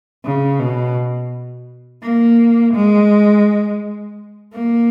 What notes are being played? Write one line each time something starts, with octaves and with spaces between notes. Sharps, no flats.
C#3
B2
A#3
G#3
A#3